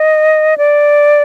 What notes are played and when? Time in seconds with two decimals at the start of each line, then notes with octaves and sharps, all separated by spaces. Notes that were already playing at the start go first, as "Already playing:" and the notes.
Already playing: D#5
0.58 D5